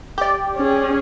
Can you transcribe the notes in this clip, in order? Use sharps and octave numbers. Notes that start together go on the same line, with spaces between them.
G4 D5
C#4 G#4